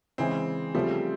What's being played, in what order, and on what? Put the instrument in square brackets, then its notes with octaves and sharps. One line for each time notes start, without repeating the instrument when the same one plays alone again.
[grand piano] C#3 E3 G#3 [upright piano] C4
[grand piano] C#3 F3 A3 C4 [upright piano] G3